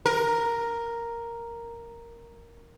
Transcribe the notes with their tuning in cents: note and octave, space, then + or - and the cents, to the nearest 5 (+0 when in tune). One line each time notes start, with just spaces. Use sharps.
A#4 +0